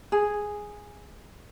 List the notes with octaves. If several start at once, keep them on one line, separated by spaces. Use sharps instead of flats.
G#4